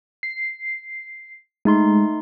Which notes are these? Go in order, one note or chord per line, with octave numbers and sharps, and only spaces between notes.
C7
G#3 A3 D#4 C6